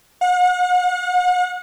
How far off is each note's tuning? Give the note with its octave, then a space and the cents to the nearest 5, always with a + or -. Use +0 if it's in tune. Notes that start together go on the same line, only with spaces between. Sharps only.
F#5 -40